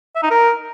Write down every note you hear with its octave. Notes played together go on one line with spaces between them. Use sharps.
E5
D#4
A#4